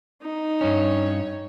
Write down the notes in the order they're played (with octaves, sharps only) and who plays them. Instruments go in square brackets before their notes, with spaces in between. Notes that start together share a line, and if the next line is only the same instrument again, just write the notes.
[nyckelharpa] D#4
[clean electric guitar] G2 C#4 [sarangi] C#5